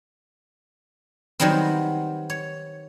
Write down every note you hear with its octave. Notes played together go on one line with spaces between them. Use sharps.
D#3 F#3 G3 B3 C4
C#5